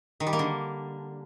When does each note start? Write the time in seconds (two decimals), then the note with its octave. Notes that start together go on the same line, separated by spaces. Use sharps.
0.20 D#3
0.27 G3
0.33 A#3
0.39 D3